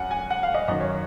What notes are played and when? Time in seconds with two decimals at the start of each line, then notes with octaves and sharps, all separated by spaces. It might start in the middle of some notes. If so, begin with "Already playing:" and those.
Already playing: F#2 F#5 G#5
0.11 G#5
0.30 F#5
0.43 F5
0.54 D#5
0.68 F#2 D#3 D#5
0.80 C#5